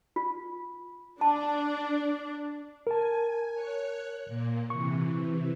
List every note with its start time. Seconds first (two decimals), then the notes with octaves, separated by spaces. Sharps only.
0.16 F4
1.21 D4 A5
2.87 A#4 G#5 A5
3.54 C#5 F#6 C#7
4.27 A#2 A#3
4.70 C3 E3 C#6